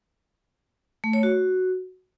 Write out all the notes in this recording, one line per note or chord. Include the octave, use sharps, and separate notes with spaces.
A3
C#5
F#4